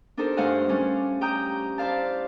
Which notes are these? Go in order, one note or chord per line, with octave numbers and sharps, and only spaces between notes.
D4 D#4 G4 A4 A#4 C5
G2 A3 C5 F5 F#5 G#5
G3 A3 C#4
G4 G5 A#5 D#6 G6
E4 C5 D5 F5 A5